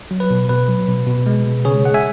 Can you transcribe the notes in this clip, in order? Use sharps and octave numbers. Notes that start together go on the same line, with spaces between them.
F#3
B4
B2
B2 B4
F#3
B2
B2
G#3
B2
C#3 G#4 C#5
G#3 F#5
E5 G#5